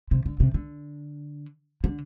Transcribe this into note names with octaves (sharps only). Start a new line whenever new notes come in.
C3
D3
C3
D3
D3